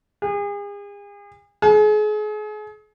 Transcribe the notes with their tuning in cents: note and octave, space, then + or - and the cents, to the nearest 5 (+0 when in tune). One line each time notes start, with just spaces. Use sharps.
G#4 -40
G#4 +35